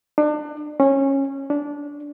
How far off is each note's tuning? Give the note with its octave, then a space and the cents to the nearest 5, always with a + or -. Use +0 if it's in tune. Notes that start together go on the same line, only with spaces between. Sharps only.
D4 +35
C#4 -20
D4 -15